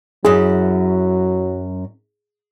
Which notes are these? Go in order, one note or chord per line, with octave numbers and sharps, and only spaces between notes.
F#2 F#3 E4 G#4